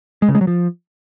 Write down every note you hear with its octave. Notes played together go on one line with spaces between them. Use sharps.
G#3
C#3
G#3
F#3
F3